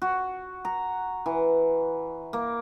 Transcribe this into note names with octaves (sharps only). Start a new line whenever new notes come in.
F#4
A#5
E3
A#3